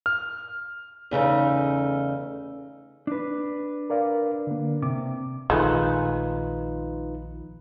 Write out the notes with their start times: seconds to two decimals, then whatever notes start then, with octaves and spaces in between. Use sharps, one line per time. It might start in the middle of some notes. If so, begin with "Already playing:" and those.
0.06 F6
1.11 E2 C#3 A3 D#4
3.07 D4 B4
3.90 A#4 D5 F5
4.47 D3 A#3
4.82 C3 D6
5.50 A#1 D#3 G#3 A3 D#4 F4 B4